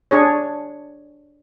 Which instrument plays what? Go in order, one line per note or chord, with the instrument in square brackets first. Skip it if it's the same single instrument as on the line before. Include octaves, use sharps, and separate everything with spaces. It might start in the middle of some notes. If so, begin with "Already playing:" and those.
[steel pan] D4 G#4 C#5